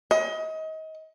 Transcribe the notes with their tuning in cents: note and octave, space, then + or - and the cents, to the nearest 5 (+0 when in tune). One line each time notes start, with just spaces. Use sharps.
D#5 +30